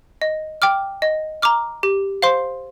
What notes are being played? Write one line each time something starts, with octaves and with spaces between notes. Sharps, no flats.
D#5
G5 D6 F6
D#5
A#5 D6 F6
G4
C5 F5 C6